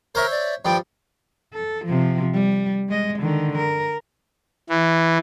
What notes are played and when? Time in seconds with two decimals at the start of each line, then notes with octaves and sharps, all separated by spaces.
0.15 A#4 C5 C#5 E5
0.31 D5
0.65 G2 F3 G3 G5
1.53 A4
1.85 C3 F3
2.33 G3
2.89 G#3 D#5
3.19 D3 D#3
3.58 A#4
4.69 E3